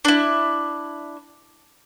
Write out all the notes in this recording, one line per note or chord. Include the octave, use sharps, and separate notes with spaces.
D4 E4